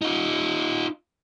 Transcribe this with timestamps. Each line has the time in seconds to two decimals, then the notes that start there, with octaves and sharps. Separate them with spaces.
0.02 D#4 F4